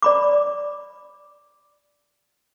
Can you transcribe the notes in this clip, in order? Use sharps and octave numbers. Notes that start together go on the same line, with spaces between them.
D5 B5 D6